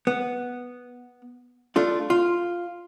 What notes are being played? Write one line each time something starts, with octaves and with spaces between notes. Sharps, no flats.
B3
A3 D4 F4
F4